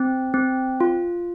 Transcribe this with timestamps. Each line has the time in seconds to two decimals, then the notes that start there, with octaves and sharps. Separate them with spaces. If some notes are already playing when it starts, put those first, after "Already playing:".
Already playing: C4
0.34 C4
0.80 F4